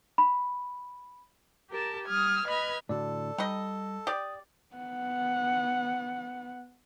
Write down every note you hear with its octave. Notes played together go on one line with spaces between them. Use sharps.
B5
G4 A#4 A5
G3 D#6 F6 G#6
B4 D#5 B5 F6 G#6
A2 D3 F#4 A4 D5
G3 D#4 D#5 G5 B5
G4 D5 D#6
B3 F#5